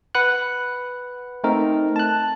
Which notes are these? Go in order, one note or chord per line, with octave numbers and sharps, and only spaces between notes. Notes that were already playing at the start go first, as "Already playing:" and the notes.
B4 F#5 F#6
A3 C4 D#4 A#4
A5 F#6